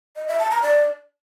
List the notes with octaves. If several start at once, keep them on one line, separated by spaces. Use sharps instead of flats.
D#5
E5
A5
A#5
D5